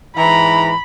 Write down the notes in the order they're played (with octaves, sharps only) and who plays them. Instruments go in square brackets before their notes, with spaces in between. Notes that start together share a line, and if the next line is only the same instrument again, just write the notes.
[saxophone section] G#2 E3 [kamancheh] A#5 [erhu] B5